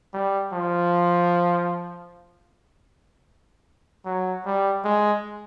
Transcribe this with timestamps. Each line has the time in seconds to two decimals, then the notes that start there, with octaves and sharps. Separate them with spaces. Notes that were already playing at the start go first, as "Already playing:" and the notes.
0.14 G3
0.53 F3
4.05 F#3
4.46 G3
4.85 G#3